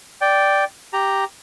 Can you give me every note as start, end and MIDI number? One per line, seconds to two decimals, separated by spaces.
0.21 0.64 74
0.21 0.64 79
0.93 1.24 67
0.93 1.24 82